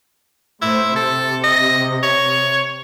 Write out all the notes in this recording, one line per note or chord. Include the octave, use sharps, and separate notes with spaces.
A2 E4 C5
C3 A4
D#5
C#5